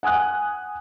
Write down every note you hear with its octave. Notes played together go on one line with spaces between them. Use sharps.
F#5 G#5 D#6 F#6